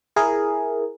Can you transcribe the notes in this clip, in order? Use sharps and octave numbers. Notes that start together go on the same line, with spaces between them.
E4 G#4 A#4